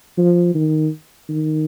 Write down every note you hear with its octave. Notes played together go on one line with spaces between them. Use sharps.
F3
D#3
D#3